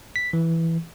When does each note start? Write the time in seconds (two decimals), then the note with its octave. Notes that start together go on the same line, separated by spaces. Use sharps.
0.16 B6
0.33 E3